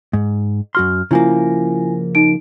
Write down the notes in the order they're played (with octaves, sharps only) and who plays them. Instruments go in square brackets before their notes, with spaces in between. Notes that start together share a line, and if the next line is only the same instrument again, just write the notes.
[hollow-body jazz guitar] G#2
[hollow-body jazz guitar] F#2 F#4 C6 [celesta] F6
[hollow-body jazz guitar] C#3 F3 A#3 [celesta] E4 F4 G#5
[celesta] D#4 D7